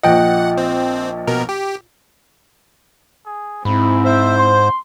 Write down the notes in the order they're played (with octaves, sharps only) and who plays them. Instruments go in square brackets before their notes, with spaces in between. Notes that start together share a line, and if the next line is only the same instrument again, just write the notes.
[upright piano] A#1 A#2 F3 [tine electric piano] D#5 G5 [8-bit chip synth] F#5
[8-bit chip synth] C4
B2 A#4
G4
[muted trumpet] G#4
[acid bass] G#2 [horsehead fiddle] C4 E4 [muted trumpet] B5
[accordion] C5 [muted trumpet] E5
[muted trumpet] C6